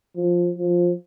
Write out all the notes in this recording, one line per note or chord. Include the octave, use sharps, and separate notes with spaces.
F3
F3